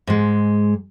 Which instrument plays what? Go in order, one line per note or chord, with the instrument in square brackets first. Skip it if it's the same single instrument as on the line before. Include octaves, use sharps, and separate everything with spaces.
[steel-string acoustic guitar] G#2 G#3